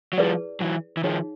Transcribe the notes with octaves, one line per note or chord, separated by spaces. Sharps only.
F#3
F3 G3 E4 G#4 B4 D5
E3 F#3
E3
D#3 F3 D#4 G#4 C#5 F5